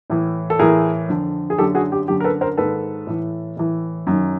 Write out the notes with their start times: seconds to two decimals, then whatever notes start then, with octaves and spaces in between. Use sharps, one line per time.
0.10 A2 E3
0.50 A4
0.59 A2 E3 G#4 A#4
1.09 F2 D3
1.50 G#4
1.58 F#2 D3 G4 A4
1.75 F#4 G#4
1.92 G4
2.08 F#2 D3 G4
2.20 A#4
2.24 A4 B4
2.41 A#4 C5
2.58 G#2 D#3 A4 B4
3.07 A2 E3
3.57 A2 E3
4.07 F#2 D#3